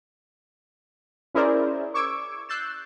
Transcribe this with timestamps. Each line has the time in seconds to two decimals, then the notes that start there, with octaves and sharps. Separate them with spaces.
1.34 C#4 E4 G#4 A#4 C5 D5
1.94 C#6 D6 E6 G#6 D7
2.49 E6 F#6 G6 A6 C7 E7